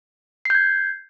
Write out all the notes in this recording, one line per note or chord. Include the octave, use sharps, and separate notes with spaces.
G6 G#6 C7